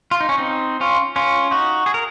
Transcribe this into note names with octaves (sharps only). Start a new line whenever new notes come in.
F4
D#4
C#4
C4 D#4
C#4 F4
C#4 F4
D#4 F#4
G#4
A#4